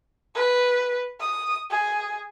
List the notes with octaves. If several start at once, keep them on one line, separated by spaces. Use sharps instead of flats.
B4
D#6
G#4